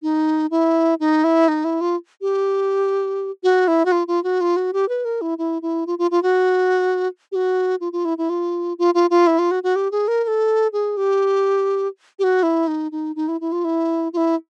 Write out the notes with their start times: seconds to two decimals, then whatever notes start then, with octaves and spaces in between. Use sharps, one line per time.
0.03 D#4
0.51 E4
1.00 D#4
1.24 E4
1.48 D#4
1.64 E4
1.81 F4
2.21 G4
3.43 F#4
3.68 E4
3.85 F#4
3.92 F4
4.08 F4
4.24 F#4
4.41 F4
4.56 F#4
4.73 G4
4.89 B4
5.05 A#4
5.21 E4
5.38 E4
5.62 E4
5.87 F4
5.99 F4
6.11 F4
6.23 F#4
7.32 G4
7.35 F#4
7.81 F4
7.93 F4
8.05 E4
8.18 E4
8.30 F4
8.79 F4
8.94 F4
9.10 F4
9.27 E4
9.39 F4
9.51 F#4
9.63 F#4
9.76 G4
9.92 G#4
10.08 A#4
10.24 A#4
10.28 A4
10.73 G#4
10.97 G4
12.19 G4
12.24 F#4
12.43 E4
12.67 D#4
12.92 D#4
13.16 D#4
13.28 E4
13.41 E4
13.52 F4
13.65 E4
14.13 F4
14.17 E4